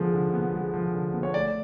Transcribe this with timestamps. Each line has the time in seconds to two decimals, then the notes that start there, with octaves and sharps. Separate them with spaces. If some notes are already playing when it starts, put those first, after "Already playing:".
Already playing: D3 F3 G#3 B3
0.13 D3
0.34 B3
0.54 G#3
0.74 F3
0.94 D3
1.14 B3
1.23 C#5
1.34 A3 D5